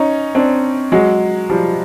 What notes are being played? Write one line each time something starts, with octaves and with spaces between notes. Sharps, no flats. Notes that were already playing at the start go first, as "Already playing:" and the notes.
Already playing: C#4 D#4
C4 D4
F#3 G#3
F3 G3